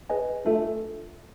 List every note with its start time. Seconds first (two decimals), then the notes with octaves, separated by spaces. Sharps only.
0.10 G#4 B4 D#5 G#5
0.45 A3 D4 F4 A4